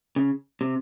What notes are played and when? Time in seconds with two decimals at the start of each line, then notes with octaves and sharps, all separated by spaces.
0.16 C#3
0.61 C3